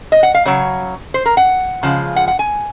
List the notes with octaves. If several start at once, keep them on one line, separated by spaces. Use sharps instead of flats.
D#5
F#5
F5
C#3 F#3 C#5
C5
A#4
F#5
C#3 F3 G#3
F#5
F#5
G#5